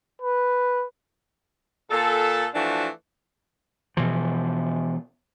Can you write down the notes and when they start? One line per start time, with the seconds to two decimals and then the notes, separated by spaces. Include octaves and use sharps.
0.22 B4
1.91 A#2 A4
2.54 E3 F3 A3 D4 F#4
3.97 B2 E3 F3